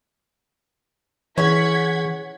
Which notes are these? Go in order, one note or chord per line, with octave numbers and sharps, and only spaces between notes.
E3 C#4 G#4 C#5 F#5 G#6 B6